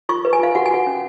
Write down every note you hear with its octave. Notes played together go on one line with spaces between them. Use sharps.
F4 C#6
B4
G#5
F4 F5
F#4 F#5
G#5
F#4 F#5
C#4